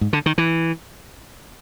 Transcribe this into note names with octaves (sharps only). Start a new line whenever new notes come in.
G#2
D3
D#3
E3